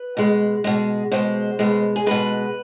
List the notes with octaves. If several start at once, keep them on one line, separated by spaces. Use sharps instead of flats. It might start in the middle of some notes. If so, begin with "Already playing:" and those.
Already playing: B4
B2 G#3
B2 G#3
B2 G#3 C5
B2 G#3
G#4
B2 G#3 B4